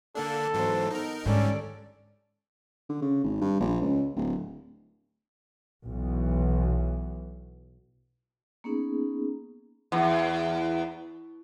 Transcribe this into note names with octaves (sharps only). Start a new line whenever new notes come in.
D3 A#3 D4 A4
G#2 E3 F#3 B3 C5
B3 D#4 A#4
G#2 D3 D#3 G3 C#4 A4 D5
D3
C#3
G#1
G2
A#1
C#2
D1
B1 B2 E3
A#3 B3 C#4 D#4 G#4
E2